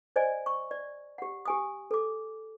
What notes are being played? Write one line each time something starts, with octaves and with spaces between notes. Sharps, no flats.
C5 D5 D#5 G#5
C#6
D5
G4 F#5
G4 G#5 D#6
A4 D6